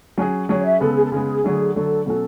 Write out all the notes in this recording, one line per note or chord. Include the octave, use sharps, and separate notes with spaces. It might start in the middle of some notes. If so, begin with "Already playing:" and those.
F#3 C#4 G#4
F#3 C#4 G#4 C#5
E5
C#3 G#3 B3 A4
G#4
A4
C#3 G#3 B3 G#4
D3 F#3 A3
D3 F#3 A3 A4
B2 F#3 C#4 F#4 A4